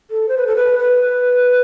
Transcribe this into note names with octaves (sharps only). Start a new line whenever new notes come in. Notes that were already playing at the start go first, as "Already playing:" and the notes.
A4
C5
B4
A4
B4
B4